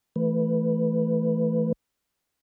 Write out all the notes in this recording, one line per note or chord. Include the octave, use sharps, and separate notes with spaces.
E3 A3 B4